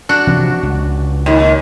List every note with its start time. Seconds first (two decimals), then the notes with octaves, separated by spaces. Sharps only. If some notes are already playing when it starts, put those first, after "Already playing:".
0.09 D4 F#4
0.27 C3 E3 F3
0.63 C#2
1.26 D#2